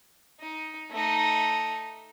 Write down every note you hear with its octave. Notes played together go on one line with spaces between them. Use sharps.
D#4
A3 D#4